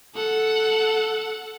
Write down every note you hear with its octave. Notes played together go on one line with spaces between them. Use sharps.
A4 F#5